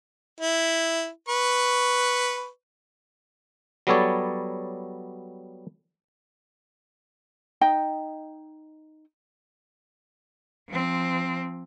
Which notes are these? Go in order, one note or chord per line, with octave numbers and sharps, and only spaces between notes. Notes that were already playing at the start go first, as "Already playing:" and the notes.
E4
B4 C#6
F#3 G3 B3 A4 C#5 D5
D#4 D#5 G5
F3 C4